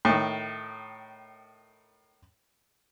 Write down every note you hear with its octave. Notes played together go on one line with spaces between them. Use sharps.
A2 D#3